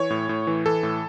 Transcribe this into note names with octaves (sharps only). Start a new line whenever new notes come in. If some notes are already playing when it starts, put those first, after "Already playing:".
Already playing: E3 C#5
A2
A2
E3
E3 A4
A2